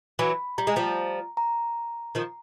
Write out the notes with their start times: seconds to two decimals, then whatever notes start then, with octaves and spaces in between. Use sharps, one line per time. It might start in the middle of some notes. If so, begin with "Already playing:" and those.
0.19 E3 F#3 B5
0.58 G3 A#5
0.67 G#3
0.76 F3 G3
1.37 A#5
2.15 D#3 F3